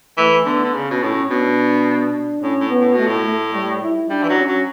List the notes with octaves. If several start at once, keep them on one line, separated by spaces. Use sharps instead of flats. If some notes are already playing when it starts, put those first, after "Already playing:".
E3 A3
D3 B3
D3
C#3 C#4
B2
A2 C#4
B2 D4
A2 C#4
A2
B3
A2
B2
A3
A2
A3
G3
E4
G3 D4
E3
F#3
C#4
F#3